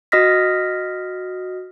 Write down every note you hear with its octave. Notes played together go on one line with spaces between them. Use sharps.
F#4 D#5 D#6 F6 A#6 B6